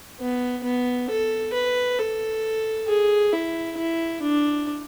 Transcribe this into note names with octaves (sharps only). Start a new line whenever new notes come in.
B3
B3
A4
B4
A4
G#4
E4
E4
D4